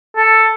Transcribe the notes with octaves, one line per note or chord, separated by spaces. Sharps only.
A4